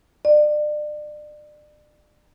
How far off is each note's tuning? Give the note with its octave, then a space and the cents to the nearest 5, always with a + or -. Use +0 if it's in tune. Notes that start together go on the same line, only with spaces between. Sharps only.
D5 +35